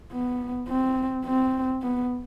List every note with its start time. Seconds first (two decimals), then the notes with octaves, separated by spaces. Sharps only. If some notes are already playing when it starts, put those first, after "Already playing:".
0.12 B3
0.68 C4
1.25 C4
1.82 B3